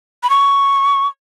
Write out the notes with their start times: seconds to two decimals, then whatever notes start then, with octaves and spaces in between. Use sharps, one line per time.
0.23 B5
0.30 C#6